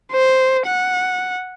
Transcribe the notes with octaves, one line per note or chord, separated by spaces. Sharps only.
C5
F#5